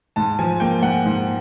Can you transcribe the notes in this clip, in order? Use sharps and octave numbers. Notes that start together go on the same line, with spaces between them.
G#2 A5
F3 G#5
A#3 G5
G#2 F#5
G#2